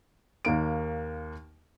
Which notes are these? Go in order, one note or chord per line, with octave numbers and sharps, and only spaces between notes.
D#2 A#3 D7